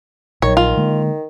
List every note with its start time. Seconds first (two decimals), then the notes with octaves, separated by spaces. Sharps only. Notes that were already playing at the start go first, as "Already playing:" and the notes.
0.42 A#1 D#3 F#3 C#5
0.57 F4
0.77 D3 G#3 A#3